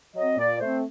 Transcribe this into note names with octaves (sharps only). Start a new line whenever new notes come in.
F#3 C4 D#5
A#2 D5
A3 C4 C5